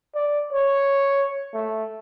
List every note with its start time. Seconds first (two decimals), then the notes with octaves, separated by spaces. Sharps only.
0.15 D5
0.53 C#5
1.54 A3